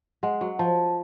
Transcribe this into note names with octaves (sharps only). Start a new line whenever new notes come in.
G#3 F#5
F#3
F3 A5